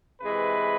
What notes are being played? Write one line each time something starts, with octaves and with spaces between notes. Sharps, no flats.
C3 E3 G#3 B4